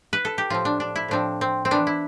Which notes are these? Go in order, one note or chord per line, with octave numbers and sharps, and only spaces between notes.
B4
A4
G4
A2 F3 C4 F4
D4
D4
E4
A2 F3 C4 D4
C4
C4
E3 B3 D4
E4